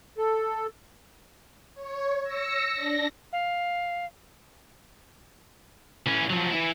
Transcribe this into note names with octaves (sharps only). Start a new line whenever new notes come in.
A4
C#5
E6 A#6 C#7
D4 A#6
F5
E3 C#4
F3 F#3
E3 E4